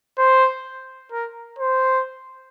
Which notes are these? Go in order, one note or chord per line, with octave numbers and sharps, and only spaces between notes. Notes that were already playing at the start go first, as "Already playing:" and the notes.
C5
A#4
C5